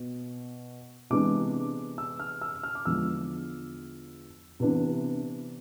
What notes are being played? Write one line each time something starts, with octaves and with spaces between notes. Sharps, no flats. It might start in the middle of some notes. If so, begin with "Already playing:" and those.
Already playing: B2
C3 E3 G#3 B3 D4 D6
E6
F6
E6
F6
D6
E2 D3 F3 G#3 E6
C3 E3 B3 D4